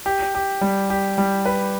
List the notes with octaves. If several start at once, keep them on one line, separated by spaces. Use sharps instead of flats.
G4
G4
G3
G4
G3
B4